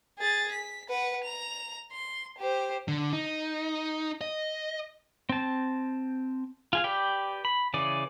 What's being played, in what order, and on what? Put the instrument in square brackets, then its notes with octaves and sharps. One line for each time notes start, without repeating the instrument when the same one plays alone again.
[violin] G#4 A6
B6
B4 F#5
A#5 F7
C6
G4 C5
[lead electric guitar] D3
D#4
D#5
[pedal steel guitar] C4 A5
F4 G#4 F5
G4 B4 D5 G5
B5
C#3 E3 G#4 D5